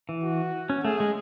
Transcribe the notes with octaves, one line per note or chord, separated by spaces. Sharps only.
E3
F#4
C#4
A3 G#4
G#3